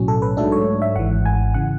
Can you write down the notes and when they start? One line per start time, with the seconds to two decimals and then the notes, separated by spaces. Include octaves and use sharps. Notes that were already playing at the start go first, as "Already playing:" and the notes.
Already playing: B1 A2 F#3 C#4
0.08 A4
0.22 B4
0.37 G#2 F#3 A3 D4 A4
0.52 C#5
0.82 E5
0.96 G#1 G#2 E3 F#5
1.26 G#5
1.54 C#3 E3 F#5